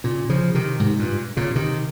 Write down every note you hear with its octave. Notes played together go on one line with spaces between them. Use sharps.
A#2 C#3
C#3 F3
C3 D#3
G#2 C3
G2 A#2
A#2 C#3
C3 D#3